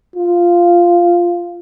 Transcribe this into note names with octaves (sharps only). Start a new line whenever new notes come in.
F4